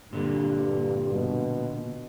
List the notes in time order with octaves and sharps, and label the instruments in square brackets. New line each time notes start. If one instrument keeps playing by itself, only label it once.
[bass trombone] G2 [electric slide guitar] A#2 D3
[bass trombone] B2